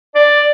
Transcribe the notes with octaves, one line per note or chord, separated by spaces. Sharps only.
D5